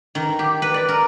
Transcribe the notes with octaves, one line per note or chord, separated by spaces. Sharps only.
D#3
G4
B4
D5
A#4